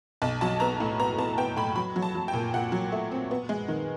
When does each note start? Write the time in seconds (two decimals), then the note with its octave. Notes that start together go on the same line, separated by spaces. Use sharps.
0.22 B1 A5
0.41 F#3 A5
0.60 B3 A#5
0.80 A2
1.00 B3 A#5
1.18 B3 A5
1.38 B3 G5
1.56 A2 B5
1.76 F#3 B5
1.96 F#3
2.02 A5
2.15 F#3
2.28 G5
2.33 A#2
2.54 A#2 F#5
2.72 F#3
2.92 A3
3.12 C4
3.31 B3
3.49 G#3
3.68 D#3